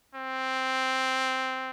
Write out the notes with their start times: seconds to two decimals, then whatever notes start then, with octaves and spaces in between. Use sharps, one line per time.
0.15 C4